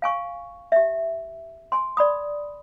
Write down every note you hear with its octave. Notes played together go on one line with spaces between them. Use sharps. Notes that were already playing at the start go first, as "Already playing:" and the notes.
F5 G#5 C#6
G4 E5
G#5 C6
D5 B5 D#6